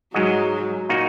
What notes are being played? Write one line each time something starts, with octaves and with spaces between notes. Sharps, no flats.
G#2 F#3 G#3 F#4 D#5
A#2 A#3 D#4 F#4